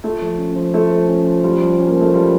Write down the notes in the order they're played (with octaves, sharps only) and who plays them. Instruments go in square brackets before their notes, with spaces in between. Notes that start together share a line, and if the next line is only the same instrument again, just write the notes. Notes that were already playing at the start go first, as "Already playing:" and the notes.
[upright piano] A3 [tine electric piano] F4
[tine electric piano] F3
C#4
F3
[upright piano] A3 [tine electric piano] F4
[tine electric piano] F3
C#4
F3
[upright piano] G3 [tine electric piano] F4
[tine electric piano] F3
C#4
[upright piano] A#3
[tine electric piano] F3 [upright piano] A3
[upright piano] G3 [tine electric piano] F4